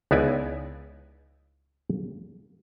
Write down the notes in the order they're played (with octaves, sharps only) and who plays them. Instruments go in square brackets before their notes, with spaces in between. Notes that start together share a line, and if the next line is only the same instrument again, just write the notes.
[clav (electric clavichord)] C#2 B3 D#4 E4 D5 G#5